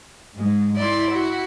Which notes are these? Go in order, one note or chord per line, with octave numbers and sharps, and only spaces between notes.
G#2 G#3
E4 D5 C6
F#4